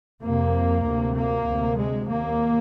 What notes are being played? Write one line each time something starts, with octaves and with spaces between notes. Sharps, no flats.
F2 C3 A#3
D2 C3
A#3
D2 C3
G#3
D#2 A#3